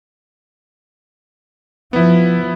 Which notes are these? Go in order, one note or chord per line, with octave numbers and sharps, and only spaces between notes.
F3 B3 E4